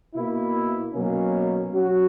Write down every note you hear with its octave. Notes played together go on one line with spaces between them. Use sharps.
B2 A#3 E4
B2 F#3 A#3 C#4
F#3 C#4 F#4